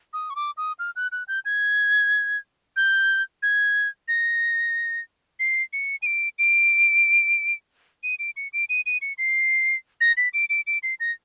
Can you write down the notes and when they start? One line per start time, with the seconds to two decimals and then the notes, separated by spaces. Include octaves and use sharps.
0.13 D#6
0.30 C#6
0.36 D6
0.57 D#6
0.79 F6
0.96 F#6
1.12 F#6
1.28 G6
1.45 G#6
2.76 G6
3.42 G#6
4.08 A#6
5.39 C7
5.73 C#7
6.02 D#7
6.06 D7
6.39 D7
8.03 D#7
8.19 D7
8.37 C#7
8.53 D7
8.69 D#7
8.86 D#7
9.02 C#7
9.18 C7
10.01 A#6
10.17 B6
10.34 D7
10.50 D7
10.67 D7
10.83 C7
11.00 A#6